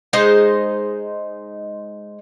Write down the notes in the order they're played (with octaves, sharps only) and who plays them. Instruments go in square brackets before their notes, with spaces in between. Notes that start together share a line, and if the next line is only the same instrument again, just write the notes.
[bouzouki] G#3 D#4 C5 D#5